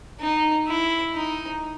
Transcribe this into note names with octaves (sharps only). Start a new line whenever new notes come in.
D#4
E4
D#4